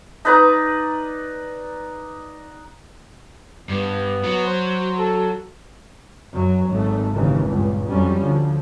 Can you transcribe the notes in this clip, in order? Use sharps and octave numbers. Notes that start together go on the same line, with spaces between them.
D#4 B4 D5 A#5
G2 B3
F#3
C5
A4
F#2 F#3
G#1 A3
G#1 D#2 A#2 C#3 E3
C#2 G2 A#2
F2 F#3 G3 C#4
D2 F3